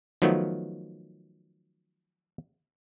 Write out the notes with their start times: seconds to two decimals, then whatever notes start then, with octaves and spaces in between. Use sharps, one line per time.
0.22 D#3 F3 F#3 A3 B3